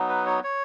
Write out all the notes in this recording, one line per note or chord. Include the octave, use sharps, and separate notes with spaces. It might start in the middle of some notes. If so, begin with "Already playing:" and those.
Already playing: F#3 B3 D#4
B4
C#5
C#5